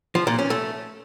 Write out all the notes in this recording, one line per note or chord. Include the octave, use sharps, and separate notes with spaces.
F3
A#2
C#4
A3